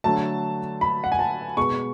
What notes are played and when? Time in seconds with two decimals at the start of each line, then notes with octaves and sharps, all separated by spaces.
0.04 D3 F#3 A3 A5
0.81 B5
1.04 F#5
1.12 G#5
1.19 A5
1.57 B2 G#3 C#6